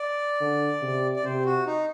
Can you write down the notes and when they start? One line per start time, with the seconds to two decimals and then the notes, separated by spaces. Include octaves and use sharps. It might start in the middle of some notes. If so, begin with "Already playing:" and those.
Already playing: D5
0.40 D3
0.82 C3
1.16 D5
1.24 C3 C5
1.45 F#4
1.66 D#4